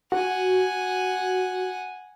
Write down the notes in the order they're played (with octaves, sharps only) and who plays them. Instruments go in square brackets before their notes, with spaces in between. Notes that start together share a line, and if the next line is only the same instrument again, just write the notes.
[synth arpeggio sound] F#4 [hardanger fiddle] F#5 G#5